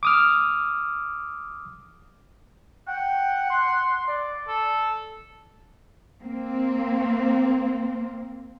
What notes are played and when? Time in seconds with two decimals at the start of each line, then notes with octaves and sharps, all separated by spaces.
0.03 D6 D#6 F6
2.88 F#5 G5
3.50 C6
4.08 D5
4.48 A4
6.21 A#3 C4